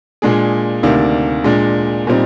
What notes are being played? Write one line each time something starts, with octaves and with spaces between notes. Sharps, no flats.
A#2 G#3 D4 G#4
D2 C3 D#3 A#3 D4
A#2 G#3 D4
A#2 G3 C4 D#4